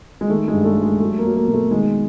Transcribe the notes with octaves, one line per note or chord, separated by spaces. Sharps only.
G#3
D#3 A3
G#3
G2
A3
G3
G#3
F#3 A3
A#3
F#3
A#3
B2
A3
D#3 G#3